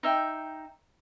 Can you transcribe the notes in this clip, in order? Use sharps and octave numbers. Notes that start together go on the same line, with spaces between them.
D#4 E5 G5